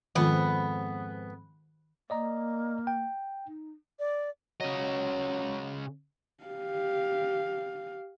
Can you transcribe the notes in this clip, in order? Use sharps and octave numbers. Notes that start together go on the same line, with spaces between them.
F2 G#2 D#3 B3 F4
A#3 D5 D#5 A#5
G5
D#4
D5
C#3 F#3 D#5
G4 F5